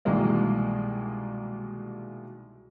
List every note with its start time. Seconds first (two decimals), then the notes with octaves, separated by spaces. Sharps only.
0.05 C2 B2 D#3 E3 G#3 A#3